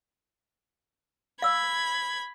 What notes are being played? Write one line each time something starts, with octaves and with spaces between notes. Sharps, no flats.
F5 B5 E6 G#6